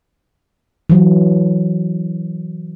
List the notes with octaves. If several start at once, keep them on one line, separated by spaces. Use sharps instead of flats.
E3 F#3